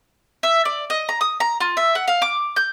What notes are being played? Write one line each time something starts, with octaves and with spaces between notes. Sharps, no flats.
E5
D5
D#5
A#5
D#6
A#5
F4
E5
F#5
F5
D6
G6